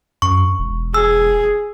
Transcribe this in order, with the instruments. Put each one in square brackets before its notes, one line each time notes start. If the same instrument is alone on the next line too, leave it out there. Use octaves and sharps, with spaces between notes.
[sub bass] F#2 [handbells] C#6
[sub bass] E1
[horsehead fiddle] G#4 [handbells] E6